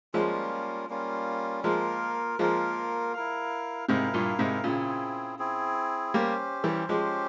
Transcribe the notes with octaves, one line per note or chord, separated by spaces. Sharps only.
F3 G3 G#3 A#3 C#4 F4
G3 A#3 C#4 F4
F3 G#3 A#3 F4 A#4
F3 G#3 A#3 F4 A#4
E4 A#4 F5
G#2 C3 E4 A#4 F5
G2 A#2
G#2 C3
A#2 C#3 C4 E4 G#4
C4 E4 G#4
G3 A#3 C#4 G4 C5
E3 G3
F3 G#3 C#4 G4 C5